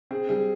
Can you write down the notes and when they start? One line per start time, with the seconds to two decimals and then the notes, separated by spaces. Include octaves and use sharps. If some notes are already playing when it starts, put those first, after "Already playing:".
0.11 C4 G#4
0.29 G3 G#4